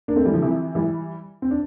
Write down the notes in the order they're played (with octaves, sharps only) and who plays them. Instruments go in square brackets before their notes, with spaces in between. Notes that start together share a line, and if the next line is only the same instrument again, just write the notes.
[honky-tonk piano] A#3 D4
A3 C4
E3 G3
D3 F3
C3 E3
E3 G3
C4
D4